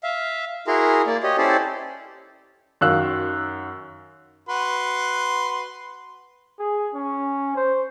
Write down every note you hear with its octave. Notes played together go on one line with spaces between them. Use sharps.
E5 F5
E4 F#4 G#4 A#4 A#5 C6
A#3 D5
G4 C#5 D#5
C#4 E4 G4 A4 C5 D5
F#2 D#3 F5 E6 F#6
F#4 B4 C6
G#4
C#4
C5